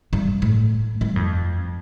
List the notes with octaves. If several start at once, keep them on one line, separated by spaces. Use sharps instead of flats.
G2
A2
G2
F2